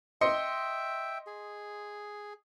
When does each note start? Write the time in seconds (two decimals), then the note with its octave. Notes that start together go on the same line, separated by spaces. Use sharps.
0.21 D#5 E5 G5 C6 C#7
1.27 G#4